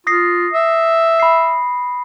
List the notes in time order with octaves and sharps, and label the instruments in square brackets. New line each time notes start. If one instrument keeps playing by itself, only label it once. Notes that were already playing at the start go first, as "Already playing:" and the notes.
[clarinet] F4 [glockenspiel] D#6 A#6 C7
[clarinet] E5
[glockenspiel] B5 C7